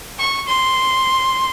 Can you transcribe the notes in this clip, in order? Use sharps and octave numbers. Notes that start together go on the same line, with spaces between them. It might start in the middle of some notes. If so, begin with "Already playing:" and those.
C#6
C6